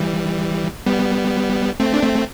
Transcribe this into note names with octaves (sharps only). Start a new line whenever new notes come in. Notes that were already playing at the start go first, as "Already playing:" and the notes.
Already playing: E3 G3
G3 B3
A3 C4
D4
A3 C4